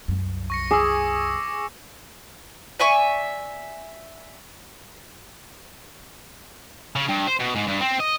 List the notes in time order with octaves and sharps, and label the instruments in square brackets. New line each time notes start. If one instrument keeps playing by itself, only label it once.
[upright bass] C2 F#2
[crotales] C#6 A#6 C#7
[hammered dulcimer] G#4 [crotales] D6 E6
[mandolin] D5 E5 G#5 C#6
[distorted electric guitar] C#3
G2
C5
B2
G#2
G2
C4
D#5